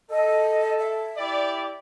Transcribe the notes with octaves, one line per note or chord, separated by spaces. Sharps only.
A4 D#5
E5
E4 G4 D5